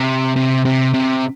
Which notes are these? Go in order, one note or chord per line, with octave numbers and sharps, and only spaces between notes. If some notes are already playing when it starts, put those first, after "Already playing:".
Already playing: C3
C3
C3
C3